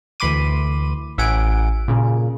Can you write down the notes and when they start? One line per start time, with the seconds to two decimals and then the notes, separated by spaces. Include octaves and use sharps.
0.20 D2 E3 B5 C6 D6 D#7
1.18 A1 E5 F#5 G#5 D7
1.88 A#2 C#3